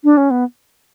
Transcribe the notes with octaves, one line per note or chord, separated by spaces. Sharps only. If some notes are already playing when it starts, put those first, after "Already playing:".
D4
C#4
B3